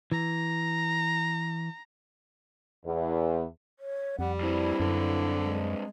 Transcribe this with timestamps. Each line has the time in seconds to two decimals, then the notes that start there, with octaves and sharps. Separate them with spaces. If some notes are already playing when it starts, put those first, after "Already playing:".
0.12 E3 A#5
2.84 E2
3.79 C#5
4.19 F2 G3 F#5
4.40 G2 C4 E4
4.80 F#2 D3
5.41 G#3